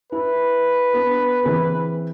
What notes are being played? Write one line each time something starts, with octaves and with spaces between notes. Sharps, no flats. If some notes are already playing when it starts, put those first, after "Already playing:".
E4 B4
B3 D4
E3 C4 G#4